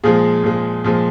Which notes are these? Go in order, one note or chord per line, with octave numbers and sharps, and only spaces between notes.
A#2 F3 G#3 G#4
A#2 F3 G#3
A#2 F3 G#3